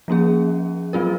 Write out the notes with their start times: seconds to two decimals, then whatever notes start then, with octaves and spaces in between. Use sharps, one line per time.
0.08 F3 A#3 C#4 G#4
0.93 F#3 C4 F4 A#4